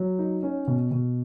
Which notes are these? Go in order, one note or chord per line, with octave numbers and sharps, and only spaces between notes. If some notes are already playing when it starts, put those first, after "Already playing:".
Already playing: F#3
D#4
C#4
B2
B2